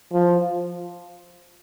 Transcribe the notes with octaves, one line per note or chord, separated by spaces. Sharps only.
F3